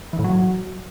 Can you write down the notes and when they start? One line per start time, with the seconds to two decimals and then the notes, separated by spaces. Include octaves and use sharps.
0.13 E3
0.19 A2
0.24 F#3